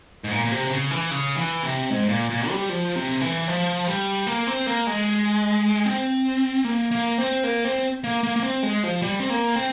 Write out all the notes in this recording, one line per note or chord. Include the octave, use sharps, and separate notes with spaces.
G#2
A#2
A#2
C3
C#3
E3
C#3
E3
C3
G#2
A#2
A#2
G3
F3
C3
E3
F3
G3
A#3
C4
A#3
G#3
C4
A#3
A#3
C4
A#3
C4
A#3
A#3
A#3
C4
G#3
F3
G3
C4
A#3
C4